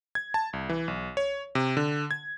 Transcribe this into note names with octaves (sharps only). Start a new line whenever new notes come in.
G#6
A5
C2
E3
B1
C#5
C3
D3
G#6